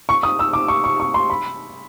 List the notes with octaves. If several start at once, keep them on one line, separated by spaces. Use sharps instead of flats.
C#6
D#6
E6
D6
C#6
C#6
C#6
C6
B5